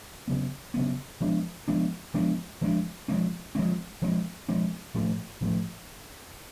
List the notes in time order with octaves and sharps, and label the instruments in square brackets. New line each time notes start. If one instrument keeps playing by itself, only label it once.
[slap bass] C#3 F#3 B3
C#3 F#3 B3
F3 G#3 B3 D4
F3 G#3 B3 D4
F3 G#3 B3 D4
F3 G#3 B3 D4
F3 G#3 C4
F3 G#3 C4
F3 G#3 C4
F3 G#3 C4
A2 F3 A3
A2 F3 A3